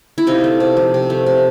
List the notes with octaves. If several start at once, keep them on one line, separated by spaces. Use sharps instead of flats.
E4
C3 D#4 F4
A3
C3
F3
C3
A3
C3